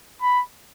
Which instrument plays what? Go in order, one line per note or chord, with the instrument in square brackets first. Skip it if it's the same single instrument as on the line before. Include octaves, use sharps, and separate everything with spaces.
[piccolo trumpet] B5